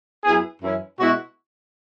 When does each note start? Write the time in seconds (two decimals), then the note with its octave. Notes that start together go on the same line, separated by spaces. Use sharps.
0.24 F#2 F#3 B3 E4 G#4
0.62 F#2 E3 C#4 E4
0.98 B2 G#3 E4 F#4